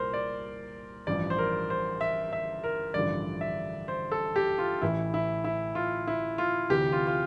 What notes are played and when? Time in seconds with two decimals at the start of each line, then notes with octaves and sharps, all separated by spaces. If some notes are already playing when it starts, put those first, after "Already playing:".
Already playing: C2 A#2 A#4 C5
0.13 D5
1.07 A1 G2 F3 D5
1.30 C5
1.38 A#4
1.70 C5
2.01 E5
2.33 E5
2.64 A#4
2.94 A1 G2 D3 F3 D5
3.41 E5
3.88 C5
4.12 A4
4.36 G4
4.58 F4
4.81 A1 A2 E3 E4
5.14 E4
5.44 E4
5.75 F4
6.07 E4
6.38 F4
6.70 D2 C3 E3 G4
6.92 F4
7.07 F4